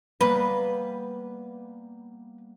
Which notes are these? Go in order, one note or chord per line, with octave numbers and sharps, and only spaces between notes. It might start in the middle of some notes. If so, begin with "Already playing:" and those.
G3 A#3 B3 B4